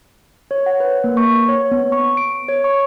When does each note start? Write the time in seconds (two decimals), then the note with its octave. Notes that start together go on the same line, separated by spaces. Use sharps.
0.51 C#5
0.66 F#5
0.80 B4
1.04 A#3
1.17 C#6
1.49 C#5
1.71 B3
1.92 C#6
2.17 D7
2.48 C#5
2.64 C#6